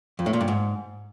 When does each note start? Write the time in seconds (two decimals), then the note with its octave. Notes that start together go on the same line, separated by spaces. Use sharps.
0.19 F2
0.26 A2
0.33 A#2
0.41 G2
0.48 G#2